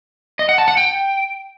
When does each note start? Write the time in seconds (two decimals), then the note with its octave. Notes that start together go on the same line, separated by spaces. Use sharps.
0.39 D#5
0.49 F#5
0.58 A5
0.68 F#5
0.77 G5